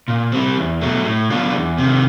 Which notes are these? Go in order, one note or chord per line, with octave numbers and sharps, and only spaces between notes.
A#2
G3 C4
E2
B2 F#3 A3
A2
F#3 B3 D4 F4
E2
C3
D#3